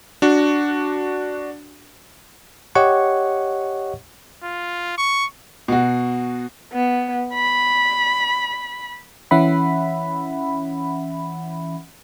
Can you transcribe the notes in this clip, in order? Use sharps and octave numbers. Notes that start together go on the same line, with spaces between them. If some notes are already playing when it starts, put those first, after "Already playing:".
D4 F#4
G4 C#5 D#5 F#5 C#6
F4
C#6
B2 F#4
B3
B5
E3 C#4 E5 F#5 B5